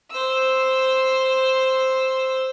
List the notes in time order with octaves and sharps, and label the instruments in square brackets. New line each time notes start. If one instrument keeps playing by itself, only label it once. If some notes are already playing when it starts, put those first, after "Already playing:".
[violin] C5 E6